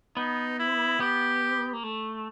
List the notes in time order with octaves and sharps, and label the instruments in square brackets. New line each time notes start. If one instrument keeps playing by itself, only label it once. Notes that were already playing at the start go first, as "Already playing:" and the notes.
[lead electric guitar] B3 [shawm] D#4
[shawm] E4
[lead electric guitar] B3 [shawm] G4
[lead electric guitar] A#3
A3